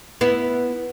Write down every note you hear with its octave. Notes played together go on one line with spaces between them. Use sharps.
B3 E4